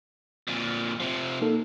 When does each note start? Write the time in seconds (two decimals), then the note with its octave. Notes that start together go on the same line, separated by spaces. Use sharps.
0.47 F2 A#2
1.00 C3 F3
1.41 A#3 D#4 A4